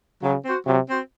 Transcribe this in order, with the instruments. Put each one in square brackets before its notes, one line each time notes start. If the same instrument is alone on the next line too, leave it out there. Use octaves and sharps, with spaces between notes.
[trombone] C#3 [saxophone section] F#3
[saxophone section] C4 F#4 C5
[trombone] C3 [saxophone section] F#3
[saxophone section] C4 F#4 C5